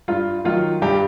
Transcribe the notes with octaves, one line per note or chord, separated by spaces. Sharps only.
G2 F4
D#3 F#3 F4
G2 G4